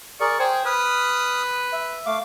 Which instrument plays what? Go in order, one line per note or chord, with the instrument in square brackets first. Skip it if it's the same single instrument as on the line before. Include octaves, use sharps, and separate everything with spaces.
[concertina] G#4 A#4 D5 [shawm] C#6
[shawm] G#4 [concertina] C5 G5
[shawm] B4 [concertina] D#6 F6
[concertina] E5
A3 F5 D6